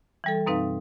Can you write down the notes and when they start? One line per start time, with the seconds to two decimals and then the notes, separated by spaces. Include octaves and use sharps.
0.24 E3 G3 A4
0.46 F#2 B2 C4 D#4 B4 F5